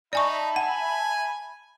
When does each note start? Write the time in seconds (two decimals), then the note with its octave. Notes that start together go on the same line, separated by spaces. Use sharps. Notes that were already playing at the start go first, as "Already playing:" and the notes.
0.13 D#4 D5 E5 G#5 A5 B5 C#6
0.56 F#5 G#5